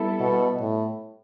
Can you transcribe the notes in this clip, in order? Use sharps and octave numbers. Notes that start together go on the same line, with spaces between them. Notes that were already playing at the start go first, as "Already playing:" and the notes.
Already playing: G3 B3 E4 A4
B2
A2